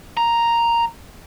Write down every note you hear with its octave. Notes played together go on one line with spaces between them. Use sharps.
A#5